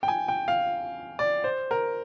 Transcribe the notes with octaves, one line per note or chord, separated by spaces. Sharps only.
G5
G#5
G5
F5
D5
C5
A#4